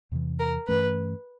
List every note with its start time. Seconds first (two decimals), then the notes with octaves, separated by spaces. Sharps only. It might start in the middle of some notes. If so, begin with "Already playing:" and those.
0.12 E2 C3 E3
0.40 A#4
0.68 G2 E3 A3 C#4 B4